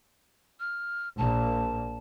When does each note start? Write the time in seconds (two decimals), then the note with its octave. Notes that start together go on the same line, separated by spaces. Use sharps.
0.60 F6
1.18 A#1 A#2 A5